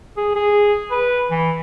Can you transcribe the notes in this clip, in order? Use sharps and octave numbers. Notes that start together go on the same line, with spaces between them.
G#4
G#4
B4
E3